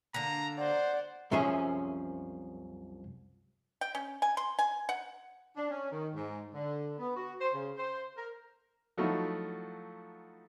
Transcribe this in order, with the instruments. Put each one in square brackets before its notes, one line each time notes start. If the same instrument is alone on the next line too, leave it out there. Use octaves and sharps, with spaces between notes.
[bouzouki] D3 A#3 [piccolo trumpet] A#5
[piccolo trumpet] C5 [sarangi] D5 [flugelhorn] F#5
[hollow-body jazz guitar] C2 F#2 F3 C#4 G#4 E5
[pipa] G5
C#4
G#5
C6
G#5
F#5
[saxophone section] D4
C#4
D#3
G#2
D3
B3
F#4
C5
C#3
C5
A#4
[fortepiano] F3 F#3 A3 D#4 E4 F#4